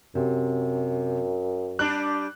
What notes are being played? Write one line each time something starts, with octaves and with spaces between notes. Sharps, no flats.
F#2 C3
G3 D4 F#6